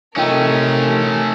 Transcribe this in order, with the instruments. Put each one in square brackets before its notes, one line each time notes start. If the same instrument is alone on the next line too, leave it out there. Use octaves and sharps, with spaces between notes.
[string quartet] C3 A#4 [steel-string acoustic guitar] F3 D#4 G5 [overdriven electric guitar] A3 C#4